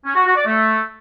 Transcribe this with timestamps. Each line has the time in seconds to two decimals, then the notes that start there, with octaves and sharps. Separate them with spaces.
0.05 C#4
0.16 F#4
0.26 F#4
0.36 D5
0.46 A3